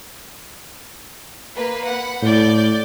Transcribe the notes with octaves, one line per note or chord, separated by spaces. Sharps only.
A#3 B4
F#5 B5
A2 D5 G6